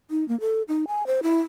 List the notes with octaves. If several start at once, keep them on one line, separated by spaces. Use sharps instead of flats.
D#4
A#3
A4
D#4
G#5
C5
E4